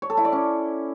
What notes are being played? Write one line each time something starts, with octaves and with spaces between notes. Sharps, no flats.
C#5
A4
E4
D5
C#4